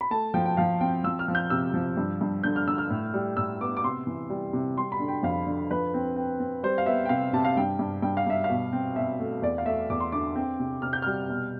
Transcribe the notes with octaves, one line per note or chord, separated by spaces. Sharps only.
B5
A3 A5
F3 G5
G5
F3 F5
C4 G5
F3 E6
F6
F3
G6
C3 E6
F3
G2
G2
D3 G6
F6
D3 E6
F6
A2
G3
A2 E6
B3 D6
D6
C3 C6
E3
G3
C3
G3 C6
B5
D3
G5
F2 F5
D3
F3 B4
C4
C4
C4
G3 C5
F5
B3 E5
G5
C3 F5
C3 A5
F5
G2 G5
G2
G2 G5
F5
G2 E5
F5
B2
C4
B2 E5
A3
E2 D5
F5
A3 E5
E2 D6
C6
D3 D6
C4
C3
C3 F6
G6
G3 F6
B2